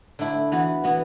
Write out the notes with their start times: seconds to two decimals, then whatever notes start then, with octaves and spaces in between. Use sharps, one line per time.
0.19 D3 A3 E4
0.52 E3 B3 F#4
0.84 E3 B3 F#4